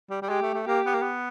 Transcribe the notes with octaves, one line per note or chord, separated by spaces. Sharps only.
G3
G3
G#3 G4
A3
A3
A#3 G4
B3
A#3
B3